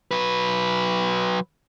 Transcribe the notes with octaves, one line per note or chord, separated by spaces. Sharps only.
F#3 B4